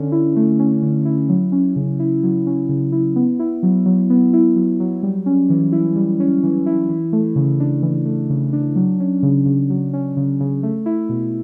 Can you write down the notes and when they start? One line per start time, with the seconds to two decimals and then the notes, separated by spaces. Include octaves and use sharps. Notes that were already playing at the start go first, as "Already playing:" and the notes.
Already playing: D3 C#4
0.12 E4
0.36 A3
0.60 C#4
0.82 D3
1.05 E4
1.29 F#3
1.52 C#4
1.76 C#3
2.00 E4
2.23 F#3
2.47 C#4
2.69 C#3
2.92 E4
3.16 B3
3.39 E4
3.63 F#3
3.86 F#3
4.10 B3
4.33 E4
4.56 F#3
4.80 F#3
5.03 G3
5.26 C#4
5.50 E3
5.72 E4
5.96 G3
6.20 C#4
6.43 E3
6.66 E4
6.89 E3
7.13 A3
7.36 C#3
7.60 D4
7.82 E3
8.06 A3
8.30 C#3
8.53 D4
8.76 F#3
9.00 C#4
9.23 C#3
9.46 C#3
9.70 F#3
9.93 C#4
10.17 C#3
10.40 C#3
10.63 A3
10.86 E4
11.09 B2